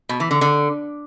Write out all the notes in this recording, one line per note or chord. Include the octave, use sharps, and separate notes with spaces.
B2
E3
D3
D3